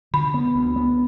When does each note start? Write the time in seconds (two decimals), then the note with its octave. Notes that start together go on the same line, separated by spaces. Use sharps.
0.13 D3 B5
0.34 B3
0.55 D2
0.76 B3